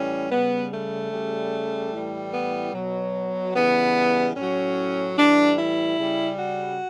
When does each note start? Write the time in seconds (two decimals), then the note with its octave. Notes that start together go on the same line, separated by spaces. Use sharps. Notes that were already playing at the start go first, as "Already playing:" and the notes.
Already playing: A2 E3 G3 C#4
0.29 C#3 G3 B3
0.71 A3
1.11 C#3 G3
1.93 A2 E3 G3
2.33 B3
2.73 B2 F#3
3.54 C#3 E3 G3 B3
4.35 A2 F#3 C#4
5.17 A2 E3 G3 D4
5.57 E4
5.98 C#3 G3
6.38 F#4